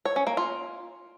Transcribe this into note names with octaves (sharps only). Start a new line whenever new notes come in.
C#5
C#4
A#3
F4